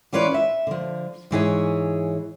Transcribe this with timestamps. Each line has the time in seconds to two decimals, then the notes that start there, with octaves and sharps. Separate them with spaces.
0.13 E3 C#4 F4 B4 C#5 D5
0.34 E5
0.67 D3 F3
1.31 G#2 E3 G#4 C#5